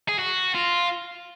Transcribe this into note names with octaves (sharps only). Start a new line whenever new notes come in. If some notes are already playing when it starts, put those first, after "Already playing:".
G#4
F#4
F4